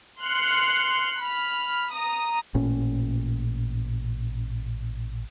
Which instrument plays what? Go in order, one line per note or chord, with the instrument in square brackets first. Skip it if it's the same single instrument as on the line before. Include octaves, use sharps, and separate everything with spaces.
[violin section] C6 F6 F#6 C7 C#7
B5 F6
A#5 D#6
[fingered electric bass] A1 A#2 C#4